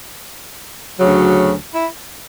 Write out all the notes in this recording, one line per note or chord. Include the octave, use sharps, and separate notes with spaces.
D2 C#3 F#3
E4